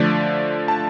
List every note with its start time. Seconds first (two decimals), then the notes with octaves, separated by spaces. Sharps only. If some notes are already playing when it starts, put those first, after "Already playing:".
Already playing: D3 F3 A3 D5
0.68 A5